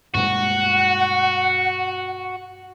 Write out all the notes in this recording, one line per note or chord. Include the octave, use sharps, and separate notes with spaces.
G2 B2 G#3 F#4 F#5